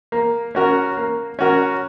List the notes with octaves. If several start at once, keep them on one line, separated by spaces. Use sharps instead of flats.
A#3
C#4 F#4 A#4
A#3
C#4 F#4 A#4